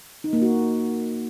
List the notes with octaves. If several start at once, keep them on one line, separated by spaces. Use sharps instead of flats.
D#4
A#3
F#4